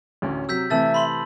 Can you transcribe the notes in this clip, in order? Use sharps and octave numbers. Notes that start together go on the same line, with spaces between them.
A1 D2 C#4
C3 F#3 E6 G6 B6
C3 E3 A3 E5 A5 E6 A6
B5 C6 F#7